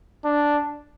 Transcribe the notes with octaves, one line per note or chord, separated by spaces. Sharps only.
D4